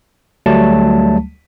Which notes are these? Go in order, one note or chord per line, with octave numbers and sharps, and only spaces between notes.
D2 F#3 G3 A3 A5